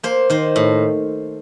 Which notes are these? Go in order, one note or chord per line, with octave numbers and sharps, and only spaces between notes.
A#3 C5
D#3 C5
A2